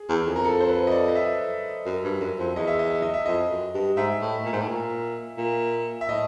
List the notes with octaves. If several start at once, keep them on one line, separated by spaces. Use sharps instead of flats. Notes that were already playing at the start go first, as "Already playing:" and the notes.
Already playing: G#4
E2
F2
A#4
A4
C5
B4
D#5
D5
D#5
E5
F#2
G2
F#2
F2
E2 D#5
E5
D#5
E5
D#5
E5
F2 D#5
F#2
G2
G#2 E5
A2
A#2
G#2
A2
A#2
A#2
E5
A2 D#5